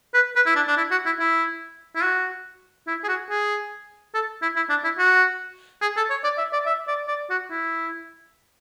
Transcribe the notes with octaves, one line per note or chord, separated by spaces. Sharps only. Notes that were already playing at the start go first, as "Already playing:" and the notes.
B4
B4
E4
D4
D4
E4
F#4
E4
E4
E4
F#4
E4
G#4
F#4
G#4
A4
E4
E4
D4
E4
F#4
G#4
A4
C#5
D5
E5
D5
E5
D5
D5
F#4
E4